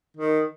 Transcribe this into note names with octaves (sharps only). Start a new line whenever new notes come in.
D#3